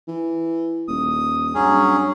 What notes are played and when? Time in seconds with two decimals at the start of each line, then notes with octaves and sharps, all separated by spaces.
0.08 E3
0.88 D#1 D#6
1.55 G2 F#3 C#4 G#4